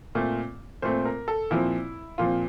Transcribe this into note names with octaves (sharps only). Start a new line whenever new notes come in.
A#2 A3 C4
A#2 A3 C4 C5
A#4
A4
A#2 F3 C4 E4
A#2 F3 C4 F4